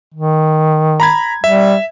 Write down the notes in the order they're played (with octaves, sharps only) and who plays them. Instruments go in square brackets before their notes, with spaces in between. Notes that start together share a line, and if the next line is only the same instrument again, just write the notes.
[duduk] D#3
[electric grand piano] A#5 B5 G#6
[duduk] G3 [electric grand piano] E5